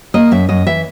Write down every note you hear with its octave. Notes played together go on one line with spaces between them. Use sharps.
A#3 D#5
F#2 E5
F#2 D#5
E3 E5